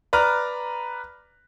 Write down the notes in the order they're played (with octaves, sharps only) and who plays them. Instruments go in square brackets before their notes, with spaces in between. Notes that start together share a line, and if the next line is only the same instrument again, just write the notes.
[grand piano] B4 D5 A#5 F6